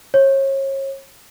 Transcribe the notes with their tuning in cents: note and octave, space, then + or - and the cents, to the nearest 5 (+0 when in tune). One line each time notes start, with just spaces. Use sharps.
C#5 -35